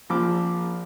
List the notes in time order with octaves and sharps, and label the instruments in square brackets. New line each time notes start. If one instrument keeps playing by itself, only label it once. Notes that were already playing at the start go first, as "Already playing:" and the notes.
[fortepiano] A#1 F3 B5 D6